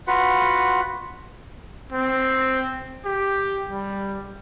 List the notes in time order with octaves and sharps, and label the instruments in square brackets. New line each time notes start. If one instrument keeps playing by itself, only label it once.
[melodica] F4 F#4 B4 F#5
[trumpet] C4
G4
G3